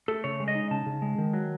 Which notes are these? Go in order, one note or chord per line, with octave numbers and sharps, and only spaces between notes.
A3 A4
C#3 C#5
G#3
D#5
D#4
C#3 A5
C#3
G#3
D#3
F#3